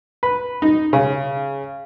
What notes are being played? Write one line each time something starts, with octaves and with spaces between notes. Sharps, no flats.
B4
D#4
C#3